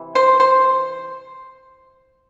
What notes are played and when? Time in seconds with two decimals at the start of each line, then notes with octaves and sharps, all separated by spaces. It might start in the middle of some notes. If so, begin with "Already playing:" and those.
Already playing: C3 E3
0.15 C5
0.40 C5